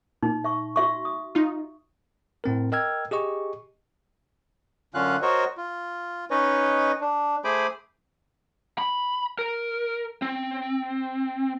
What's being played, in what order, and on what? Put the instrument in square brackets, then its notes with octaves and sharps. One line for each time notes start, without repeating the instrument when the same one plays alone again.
[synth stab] A#2 [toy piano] D#4
[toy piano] E5 C#6
F#4 E5 C#6
D#6
[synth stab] D#4 F4
[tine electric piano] A2 C4 A#4
A#4 D#5 G5 E6 F6 G#6
G4 G#4 D#5 C#6
[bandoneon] F#2 D3 C#4 F4 F5 F#6
F#4 A#4 C5 C#5 D#5
F4
C#4 D#4 B4 C#5 D#5
D4
A3 G#4 C5 G#5 B5 D6
[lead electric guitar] B5
A#4
C4